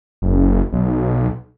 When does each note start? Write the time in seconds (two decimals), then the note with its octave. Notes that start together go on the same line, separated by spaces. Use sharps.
0.22 F#1
0.73 B1